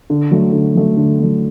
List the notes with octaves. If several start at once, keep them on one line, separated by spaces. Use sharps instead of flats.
D3
F#3 A3
D3
F#3 A3
D3
F#3 A3